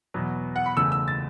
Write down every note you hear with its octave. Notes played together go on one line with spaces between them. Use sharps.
E2 B2 F#3 B3
F#5
B5
F#1 E2 C#3 A3 E6
E6
A6